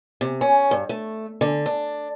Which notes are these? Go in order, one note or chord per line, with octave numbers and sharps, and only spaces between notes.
C3
C#4
G2
A3
D3
D4